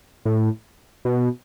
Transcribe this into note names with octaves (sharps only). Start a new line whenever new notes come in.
A2
B2